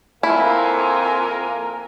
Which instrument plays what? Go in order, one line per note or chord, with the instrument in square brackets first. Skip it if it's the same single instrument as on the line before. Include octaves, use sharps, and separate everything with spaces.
[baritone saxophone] F2 [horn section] A#3 A#4 [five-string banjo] E4 [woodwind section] F4 F5 G#5